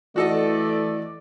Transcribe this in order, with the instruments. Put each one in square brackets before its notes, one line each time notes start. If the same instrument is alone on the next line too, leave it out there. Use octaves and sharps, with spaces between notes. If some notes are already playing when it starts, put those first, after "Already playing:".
[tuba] E3 [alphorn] A3 [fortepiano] F#4 A4 D#5 [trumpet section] D5